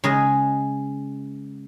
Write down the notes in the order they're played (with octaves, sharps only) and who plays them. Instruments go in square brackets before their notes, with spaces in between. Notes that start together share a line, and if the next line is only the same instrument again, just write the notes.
[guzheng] C#3 G#3 G#4 D#5